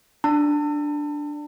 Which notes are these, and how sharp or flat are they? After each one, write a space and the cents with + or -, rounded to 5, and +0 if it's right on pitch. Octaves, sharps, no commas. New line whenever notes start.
D4 +0 A5 +40